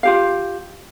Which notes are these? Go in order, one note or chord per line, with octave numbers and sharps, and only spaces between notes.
F4 G4 F5